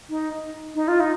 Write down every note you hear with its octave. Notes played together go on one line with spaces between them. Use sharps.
D#4
D#4
F4
D#4